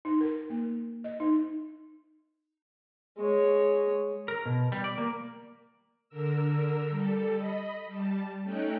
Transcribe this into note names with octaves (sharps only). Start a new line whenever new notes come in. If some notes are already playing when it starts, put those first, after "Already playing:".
D#4
A#4
A#3
D#5
D#4
G#3 C#5
A#4
B2
G3
D5
A#3
D3 A#4 E6
G3 A4
D#5 B5
G3 A5
A3 C#4 D#4 G5 F#6